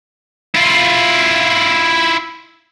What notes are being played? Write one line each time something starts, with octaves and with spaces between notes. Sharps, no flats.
E4 F4